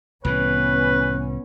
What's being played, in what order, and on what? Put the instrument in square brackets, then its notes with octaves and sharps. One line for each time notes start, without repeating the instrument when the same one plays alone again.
[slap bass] C2 A2 E3 [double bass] B3 C#4 [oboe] B4